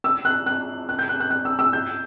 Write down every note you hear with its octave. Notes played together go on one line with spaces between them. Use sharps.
E6
F#6
F#6
F#6
G6
F#6
F#6
F#6
E6
E6
G6